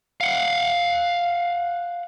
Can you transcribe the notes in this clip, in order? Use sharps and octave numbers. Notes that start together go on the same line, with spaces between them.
F5 F#5